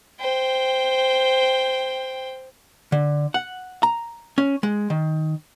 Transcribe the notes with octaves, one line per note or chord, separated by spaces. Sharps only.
C5 G5
D3
F#5
A#5
C#4
G#3
D#3